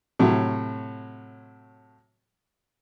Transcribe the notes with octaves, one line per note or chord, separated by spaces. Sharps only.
A2 C3 F#3